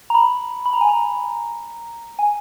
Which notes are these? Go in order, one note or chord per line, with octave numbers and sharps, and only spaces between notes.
A#5
B5
B5
A#5
G#5
A#5
G#5